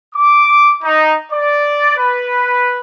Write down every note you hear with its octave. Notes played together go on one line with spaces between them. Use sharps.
D6
D#4
D5
B4